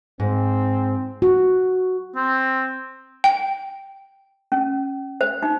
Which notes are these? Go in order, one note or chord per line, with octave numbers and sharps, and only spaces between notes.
G#2 C4
F#4
C4
G5
C#4
C5
D#4